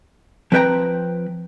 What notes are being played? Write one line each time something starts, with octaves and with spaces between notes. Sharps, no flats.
F3 C4 B4 C5 G5 A#5